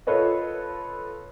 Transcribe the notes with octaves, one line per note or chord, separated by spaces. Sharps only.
F4 A4 B4 C#5 D#5